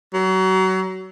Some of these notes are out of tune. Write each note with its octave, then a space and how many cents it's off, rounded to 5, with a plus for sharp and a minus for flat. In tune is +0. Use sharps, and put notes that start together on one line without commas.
F#3 +30